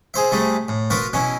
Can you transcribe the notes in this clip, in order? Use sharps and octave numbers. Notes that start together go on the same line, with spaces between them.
G#4 C5 E5
C3 G3 A3 G#4
A2
B3 F4 F#4 A#4 B4
B2 F#3 C#4 E4